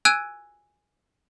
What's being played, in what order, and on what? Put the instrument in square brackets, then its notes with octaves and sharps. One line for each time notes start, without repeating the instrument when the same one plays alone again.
[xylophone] G#5 E6 F#6 G#6 D7 D#7